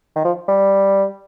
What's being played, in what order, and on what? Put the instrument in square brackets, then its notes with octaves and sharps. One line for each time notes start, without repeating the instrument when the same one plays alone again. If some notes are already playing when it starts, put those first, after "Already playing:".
[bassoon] D#3
F3
G3